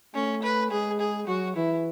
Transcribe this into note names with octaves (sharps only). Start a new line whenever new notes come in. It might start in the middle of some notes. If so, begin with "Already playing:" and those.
A3 C#4
B4
G#3 G#4
G#4
F#3 F#4
E3 E4